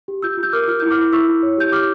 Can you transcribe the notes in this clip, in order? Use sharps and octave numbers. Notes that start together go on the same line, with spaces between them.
G4
F4 E6 G6
F4
E6 G6
A#4 D6 F6
F4 F6
E4 G6
D6 F6
E4
E4 C#6 E6
E4
C#5
G4 G6
G4 D6 F6